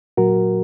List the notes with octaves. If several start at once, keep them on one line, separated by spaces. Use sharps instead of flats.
A#2 F#3 F#4 A#4